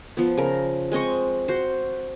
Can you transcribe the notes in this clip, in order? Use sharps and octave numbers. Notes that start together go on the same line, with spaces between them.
F3 B3
C#3 A#4
G#3 C4 D#5 C#6
F#4 C5